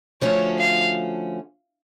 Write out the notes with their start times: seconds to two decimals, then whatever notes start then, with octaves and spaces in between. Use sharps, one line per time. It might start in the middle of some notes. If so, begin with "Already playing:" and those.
0.21 D3 F3 A3 C#4 F#4 C#5
0.58 F5